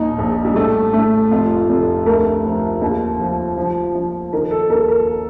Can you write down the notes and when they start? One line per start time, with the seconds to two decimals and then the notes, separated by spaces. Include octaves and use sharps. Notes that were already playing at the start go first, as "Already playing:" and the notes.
Already playing: D#2 A#2 D#4
0.18 A#1
0.45 G3
0.56 A2 A3
0.93 A2 A3
1.31 F1 F4
1.69 F1
2.06 D2 A#4
2.45 F3
2.82 D#2
3.19 F3
3.57 F3
3.95 F3
4.33 D#3 A#4
4.51 A4
4.69 D#2 A#4
4.89 A#4